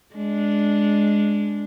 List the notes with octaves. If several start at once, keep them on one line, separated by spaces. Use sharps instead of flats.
G#3 D4